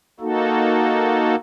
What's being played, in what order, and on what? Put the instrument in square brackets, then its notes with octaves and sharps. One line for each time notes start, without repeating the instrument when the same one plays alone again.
[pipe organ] A#3 D#4 F#4 A4